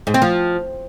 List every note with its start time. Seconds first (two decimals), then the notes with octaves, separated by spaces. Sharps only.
0.07 G#2
0.14 C4
0.22 F3